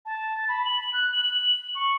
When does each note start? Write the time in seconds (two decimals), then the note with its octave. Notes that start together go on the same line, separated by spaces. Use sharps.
0.06 A5
0.48 B5
0.65 F#7
0.93 F#6
1.12 F#7
1.24 F#7
1.75 C#6